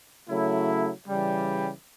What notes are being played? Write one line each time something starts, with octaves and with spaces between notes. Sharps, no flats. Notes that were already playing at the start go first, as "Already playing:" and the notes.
C#3 F#3 A3 E4
C#3 E3 G3